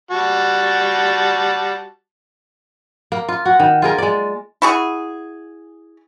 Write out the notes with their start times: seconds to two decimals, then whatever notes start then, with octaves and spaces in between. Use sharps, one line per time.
0.11 G3 F#4 A5
3.12 A#3
3.29 F4
3.46 F#4
3.60 D#3
3.82 F4 G#4 A#4
3.98 G#3 D5
4.62 E4 F#4 G#4